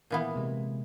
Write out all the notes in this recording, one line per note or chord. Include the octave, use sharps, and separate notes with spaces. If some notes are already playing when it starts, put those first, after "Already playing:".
A#2 E3 B3
C3 G#3